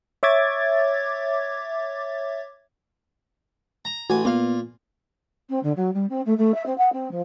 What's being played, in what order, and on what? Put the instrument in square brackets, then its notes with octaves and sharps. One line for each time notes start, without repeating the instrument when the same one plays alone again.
[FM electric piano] C#5 E5 D6 G#6 A6
[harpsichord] A#5
[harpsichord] A1 G#5 [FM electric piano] F#4
[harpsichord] A#2 F5 [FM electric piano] B3
[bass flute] C4
D3
F#3
G3
C4
A3
A3
E5
C4
F#5
C4
F3